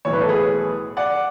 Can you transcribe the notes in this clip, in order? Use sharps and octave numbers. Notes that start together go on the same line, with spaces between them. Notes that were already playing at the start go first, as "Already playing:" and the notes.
B1 A2 E3 C#5
B4
A4
G#4 B4
D5 F#5